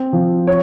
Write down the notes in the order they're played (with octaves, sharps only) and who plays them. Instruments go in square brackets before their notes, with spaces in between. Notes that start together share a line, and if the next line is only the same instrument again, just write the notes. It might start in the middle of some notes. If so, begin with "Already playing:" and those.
Already playing: [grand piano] C4
F3
C#5